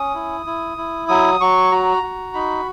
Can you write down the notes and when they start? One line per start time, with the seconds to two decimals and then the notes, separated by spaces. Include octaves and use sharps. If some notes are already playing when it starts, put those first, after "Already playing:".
Already playing: C#4 D#6
0.15 E4
0.46 E4
0.78 E4
1.08 F#3 D#6
1.40 F#3 C#6
1.72 F#4 A#5
2.03 F#4
2.34 D#4 B5